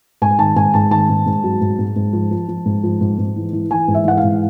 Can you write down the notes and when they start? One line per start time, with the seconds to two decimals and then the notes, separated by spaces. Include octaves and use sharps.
0.22 G#2 G#5
0.39 D#3 A5
0.56 G#2 G#5
0.74 G#2 A5
0.91 D#3 A5
1.09 G#2
1.26 G#2
1.44 F#3
1.61 G#2
1.79 G#2
1.96 G#2
2.13 F3
2.31 F3
2.48 F3
2.65 G#2
2.84 F3
3.01 G#2
3.18 G#2
3.36 E3
3.53 E3
3.71 E3 G#5
3.88 G#2
3.94 E5
4.05 E3 F#5
4.17 F5
4.23 G#2